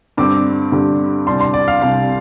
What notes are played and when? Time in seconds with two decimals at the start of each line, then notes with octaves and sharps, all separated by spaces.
0.17 G2 D3 G3 C4 D6
0.72 G2 D3 G3 C4
1.27 C2 C3 G3 D4 C6
1.41 C6
1.54 D5
1.68 F5
1.81 C2 C3 G3 D4 F5